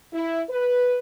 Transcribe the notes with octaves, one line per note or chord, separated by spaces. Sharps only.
E4
B4